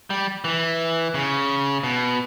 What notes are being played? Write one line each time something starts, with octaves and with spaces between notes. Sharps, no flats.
G3
E3
C#3
B2